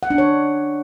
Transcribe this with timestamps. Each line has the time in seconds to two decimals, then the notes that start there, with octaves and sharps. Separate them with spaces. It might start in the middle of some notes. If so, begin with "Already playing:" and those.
0.03 F#5
0.10 D4
0.18 C#5